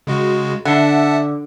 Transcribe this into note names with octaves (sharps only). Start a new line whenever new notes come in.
C#3 G#3 F#4
D3 E5 F#5 A5